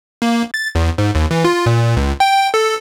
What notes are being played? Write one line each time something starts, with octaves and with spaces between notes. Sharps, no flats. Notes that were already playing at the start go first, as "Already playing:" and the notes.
A#3
A6
E2
G#2
D#2
E3
F4
A#2
C#2
G5
A4